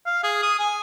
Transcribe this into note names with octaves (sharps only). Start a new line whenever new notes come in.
F5
G#4
D#6
G#5